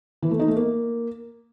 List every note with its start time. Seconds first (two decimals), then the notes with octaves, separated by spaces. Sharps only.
0.22 E3
0.31 A3
0.39 D#4
0.48 A3
0.56 A#3